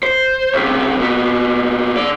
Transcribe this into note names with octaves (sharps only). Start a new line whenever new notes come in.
C5
C#2 C3
A#2 B3
C#3 D5